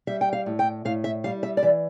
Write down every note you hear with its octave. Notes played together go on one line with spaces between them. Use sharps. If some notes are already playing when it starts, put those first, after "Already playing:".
G3 E5
G5
F5
A2
G5
A2 F5
E5
G3 F5
E5
D5
E3 E5